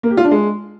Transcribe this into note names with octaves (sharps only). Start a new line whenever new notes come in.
A#3
G4
F4
D4
G#3